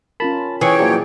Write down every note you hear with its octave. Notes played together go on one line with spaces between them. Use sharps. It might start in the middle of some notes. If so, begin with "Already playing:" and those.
C#4 F4 A#4 A5 B5
E3 G#4 C#5 G5 C#6
A#2 F3 F#3 G#4 D5